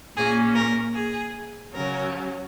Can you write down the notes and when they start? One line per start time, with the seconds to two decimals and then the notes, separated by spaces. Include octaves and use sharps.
0.16 A#2 A#3 C#4 G#4
0.55 A#4
0.94 G#4
1.74 C#3 F#3 C#4 A#4